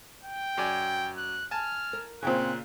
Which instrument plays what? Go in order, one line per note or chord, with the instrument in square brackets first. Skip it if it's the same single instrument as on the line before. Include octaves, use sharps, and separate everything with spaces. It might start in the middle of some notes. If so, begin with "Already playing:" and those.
[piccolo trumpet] G5
[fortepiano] F#2 D5 G#5
[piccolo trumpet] F#6
[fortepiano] G#5 A5 [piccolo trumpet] F6
[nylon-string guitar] A#4
[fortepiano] A#2 C#3 [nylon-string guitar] C4 G5 G#5 [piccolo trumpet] F#6